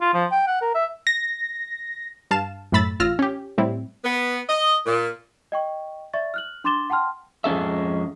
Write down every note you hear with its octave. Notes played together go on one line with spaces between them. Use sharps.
F4
F3
G5
F#5
A#4
E5
A#6
G2 F5 A5 E7
F#2 A2 A3 B5 E6 A6
A1 F4 E6 F6 A#6
C#4 G4
A2 G3 C4 E4
B3
D#5
A#2
D#5 G5 C#6
D5 E5 C#6 A6
F6 F#6 F#7
D4 C6 D6 A6 E7 G7
F#5 G5 A5 C6 F6
F2 G#3 C#4 A4 E5